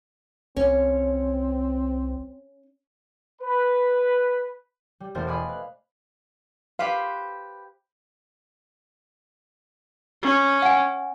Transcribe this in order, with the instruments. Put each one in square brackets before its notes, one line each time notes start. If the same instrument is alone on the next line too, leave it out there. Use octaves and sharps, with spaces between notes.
[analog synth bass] C2 [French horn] C4 [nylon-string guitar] C#4
[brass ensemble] B4
[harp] G3
E1 A3 A#3 A#4 C5 A6
D5 D#5 F5 G#5 B5
B4
[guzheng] G4 B4 C5 [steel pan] F5
[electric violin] C#4
[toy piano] F#5 G#5